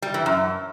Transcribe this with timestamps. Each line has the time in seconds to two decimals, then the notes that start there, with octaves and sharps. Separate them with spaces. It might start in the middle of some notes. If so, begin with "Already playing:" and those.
0.02 G3
0.14 E3
0.26 F#2